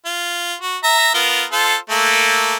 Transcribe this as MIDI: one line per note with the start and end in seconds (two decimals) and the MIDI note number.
0.06 0.54 65
0.62 0.77 66
0.84 1.14 76
0.84 1.14 82
1.14 1.44 59
1.14 1.44 65
1.14 1.44 70
1.52 1.76 65
1.52 1.76 69
1.52 1.76 72
1.90 2.57 57
1.90 2.57 58